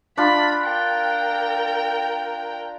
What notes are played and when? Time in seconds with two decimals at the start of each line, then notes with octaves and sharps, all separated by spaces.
0.18 D4 F4 B5
0.65 A#4 G5